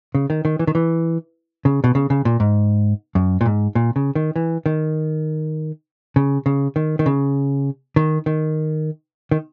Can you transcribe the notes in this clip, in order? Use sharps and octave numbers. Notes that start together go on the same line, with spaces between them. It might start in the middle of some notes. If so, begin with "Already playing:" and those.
C#3
D#3
D#3
E3
D#3
E3
C#3
B2
C#3
C#3
A#2
G#2
F#2
A#2
G#2
A#2
C#3
D#3
E3
D#3
C#3
C#3
D#3
D#3
C#3
D#3
D#3
D#3